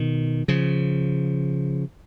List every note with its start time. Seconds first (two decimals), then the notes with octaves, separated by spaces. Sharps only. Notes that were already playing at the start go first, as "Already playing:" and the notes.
Already playing: B2 D#3
0.48 C#3 F3